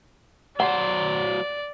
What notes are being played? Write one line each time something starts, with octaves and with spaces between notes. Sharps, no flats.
F#3 C5 D5 F#5